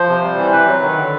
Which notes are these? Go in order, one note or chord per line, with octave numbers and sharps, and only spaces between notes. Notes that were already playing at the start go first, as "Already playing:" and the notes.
Already playing: F3 C5
C3
G3
E3
C3 B4
F#3
D#3
D3